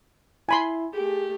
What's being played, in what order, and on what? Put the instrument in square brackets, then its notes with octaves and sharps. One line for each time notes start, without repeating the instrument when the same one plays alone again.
[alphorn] E4 [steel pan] G#5 B5 C6
[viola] A3 G4 [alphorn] G#4